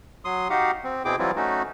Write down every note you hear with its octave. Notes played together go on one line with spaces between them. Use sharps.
F#3 C6 D#6
D#4 F#4 G4 F5 F#5
C4
B2 C4 E4 G#4 G5 D6
E3 F#3 G3 C4 E4 F4
A3 C#4 D#4 F#4